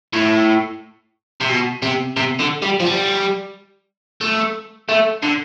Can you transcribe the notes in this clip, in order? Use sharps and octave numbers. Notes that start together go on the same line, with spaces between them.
A2
C3
B2
C3
C3
D3
G3
F3
G3
A3
A3
D3